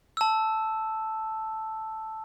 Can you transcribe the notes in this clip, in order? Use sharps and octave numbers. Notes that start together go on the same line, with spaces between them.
A5 E6